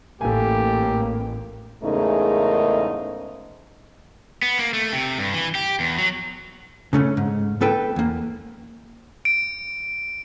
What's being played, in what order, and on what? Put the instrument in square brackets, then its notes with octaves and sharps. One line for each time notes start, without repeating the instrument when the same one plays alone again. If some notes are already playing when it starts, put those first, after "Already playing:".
[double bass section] A1 [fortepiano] A3 G#5 [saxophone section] A#3 [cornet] G4
[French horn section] E2 G#2 C#3 A3 D#4 A#4
[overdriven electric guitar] B3
A#3
A3
C3
G2
E3
G4
E2
F#3
[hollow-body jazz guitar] C#3 A3 C#4
G#2
B3 A4 B4 G5
E2 A#3
[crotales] D7